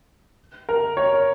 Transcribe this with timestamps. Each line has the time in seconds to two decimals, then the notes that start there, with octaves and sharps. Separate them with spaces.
0.69 A#4
0.97 C#5